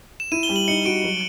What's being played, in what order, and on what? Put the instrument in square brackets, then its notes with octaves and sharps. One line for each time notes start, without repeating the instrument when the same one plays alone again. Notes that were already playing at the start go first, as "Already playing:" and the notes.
[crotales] E7
[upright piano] E4 [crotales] D#7
[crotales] G7
[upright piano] G3
[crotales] F#7
[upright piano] D#4 [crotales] C#7
[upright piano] F#4 [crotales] D7
[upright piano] F#3